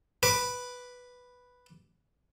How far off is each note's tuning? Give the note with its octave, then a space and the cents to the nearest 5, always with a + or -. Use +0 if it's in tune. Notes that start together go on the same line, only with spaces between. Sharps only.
B4 +0 B5 +0 D6 +0